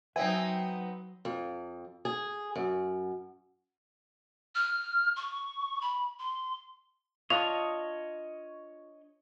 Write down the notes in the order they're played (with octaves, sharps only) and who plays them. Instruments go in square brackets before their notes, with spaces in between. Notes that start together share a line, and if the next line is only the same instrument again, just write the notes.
[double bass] F#3 [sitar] B3 C4 D#4 [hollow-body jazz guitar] E5 [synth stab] G#5
[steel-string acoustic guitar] F2
G#4
F#2
[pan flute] F6
C#6
B5
C6
[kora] D4 F4 [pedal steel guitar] C#5 D#5 [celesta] F7